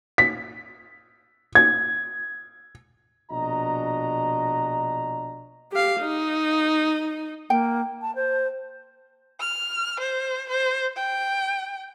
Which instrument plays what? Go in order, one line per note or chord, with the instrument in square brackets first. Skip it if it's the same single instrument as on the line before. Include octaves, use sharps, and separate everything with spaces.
[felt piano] B6
G#6
[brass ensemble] A#1 B2 D4 F#4 D#5 A#5
[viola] G4 F5
D#4
[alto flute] A#3 [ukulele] G5
[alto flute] A5
C5
[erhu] F6
C5
C5
G5